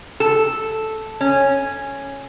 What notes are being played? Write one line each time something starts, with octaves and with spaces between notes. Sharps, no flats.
A4
C#4